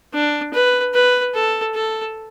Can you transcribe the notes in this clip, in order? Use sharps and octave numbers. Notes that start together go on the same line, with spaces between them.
D4
B4
B4
A4
A4